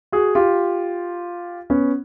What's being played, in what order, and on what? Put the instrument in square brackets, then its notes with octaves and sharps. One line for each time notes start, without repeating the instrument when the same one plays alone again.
[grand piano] F#4 G#4
F4 G4
B3 C#4